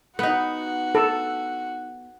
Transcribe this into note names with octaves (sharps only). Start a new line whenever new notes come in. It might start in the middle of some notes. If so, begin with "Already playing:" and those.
B3 D#4 F#4
A4